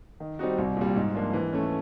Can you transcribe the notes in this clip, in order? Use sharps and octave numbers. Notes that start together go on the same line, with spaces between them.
D#3
G3 C4 D#4 F#4
C2
A#2 G3
G#2
F3 A#3 D4 F4
E3
A3 C#4